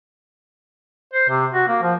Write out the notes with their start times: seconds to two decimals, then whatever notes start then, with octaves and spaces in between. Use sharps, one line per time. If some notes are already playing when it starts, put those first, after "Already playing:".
1.14 C5
1.29 C3
1.53 F#4
1.68 A#3
1.82 F3